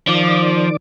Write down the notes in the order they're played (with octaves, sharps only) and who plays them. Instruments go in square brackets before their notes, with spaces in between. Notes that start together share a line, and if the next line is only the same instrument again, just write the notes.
[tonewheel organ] D#3 D5 D6 [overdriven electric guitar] F3